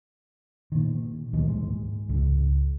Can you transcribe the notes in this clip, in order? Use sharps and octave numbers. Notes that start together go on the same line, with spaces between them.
A#2 D#3
D2 D#3 E3 A#3
G#2 G#3
C#2